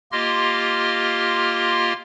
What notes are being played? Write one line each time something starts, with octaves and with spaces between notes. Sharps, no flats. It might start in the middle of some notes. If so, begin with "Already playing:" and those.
A#3 F4 G4 D#5 C6 F6